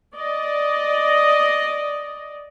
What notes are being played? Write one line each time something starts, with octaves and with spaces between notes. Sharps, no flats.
D5 D#5